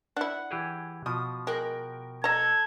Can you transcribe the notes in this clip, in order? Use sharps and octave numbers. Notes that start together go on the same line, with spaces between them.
D4 E4 F#5
E3 G4 G#4
B2 F3 D#6
G#3 A#4 G5 F#6
A4 D#5 A#5 G#6